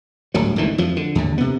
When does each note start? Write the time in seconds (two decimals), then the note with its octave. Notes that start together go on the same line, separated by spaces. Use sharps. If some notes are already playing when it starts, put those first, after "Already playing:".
0.34 D1 G1 D3 F#3
0.56 G#1 D2 D#3 E3
0.78 F2 F3
0.97 D3
1.15 D#2 D3
1.38 C3 B3